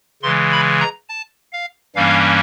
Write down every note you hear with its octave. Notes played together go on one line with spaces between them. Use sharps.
C#3 E3 G#3 C6
B5
A#5
A5
F5
G2 E3 G3 A#3 C#4 F5